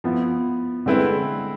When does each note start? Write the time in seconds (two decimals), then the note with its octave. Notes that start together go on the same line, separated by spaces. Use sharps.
0.04 F3 B3 E4
0.86 D3 G#3 C4 E4 B4